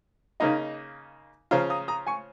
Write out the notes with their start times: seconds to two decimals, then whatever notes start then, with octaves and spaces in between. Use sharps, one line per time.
0.40 C#3 A#3 D#4 D#5
1.51 C#3 F3 C#4 F4 F5 A#5
1.70 A#5 D#6
1.88 A#5 D#6
2.07 G#5 C#6